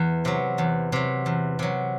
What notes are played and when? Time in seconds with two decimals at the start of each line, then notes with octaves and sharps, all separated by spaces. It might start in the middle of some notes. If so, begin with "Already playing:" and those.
Already playing: E2
0.25 C3 F#3
0.58 E2
0.92 C3 F#3
1.26 E2
1.59 C3 F#3